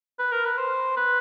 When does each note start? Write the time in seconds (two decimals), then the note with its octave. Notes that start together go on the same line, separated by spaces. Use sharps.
0.19 B4
0.32 A#4
0.45 B4
0.57 C5
0.97 B4